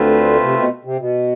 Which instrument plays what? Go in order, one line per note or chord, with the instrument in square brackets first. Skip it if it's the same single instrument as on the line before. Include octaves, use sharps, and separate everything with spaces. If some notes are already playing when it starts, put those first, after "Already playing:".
Already playing: [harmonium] D2 D3 [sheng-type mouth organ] A3 C4 F4 B4 E5
[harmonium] C3
B2
C3
B2